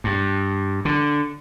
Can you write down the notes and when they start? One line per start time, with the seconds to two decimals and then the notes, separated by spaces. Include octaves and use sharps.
0.04 G2
0.85 D3